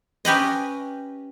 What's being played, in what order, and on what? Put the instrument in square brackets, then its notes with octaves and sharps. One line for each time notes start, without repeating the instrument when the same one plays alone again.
[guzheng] C#4 G4 B4 D#5